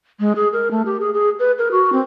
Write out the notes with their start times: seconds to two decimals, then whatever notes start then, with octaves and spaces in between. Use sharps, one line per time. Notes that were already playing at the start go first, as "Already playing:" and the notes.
0.20 G#3
0.36 G#4
0.53 A#4
0.71 A3
0.86 G4
1.00 G#4
1.13 G#4
1.39 B4
1.58 A#4
1.72 F#4
1.93 C4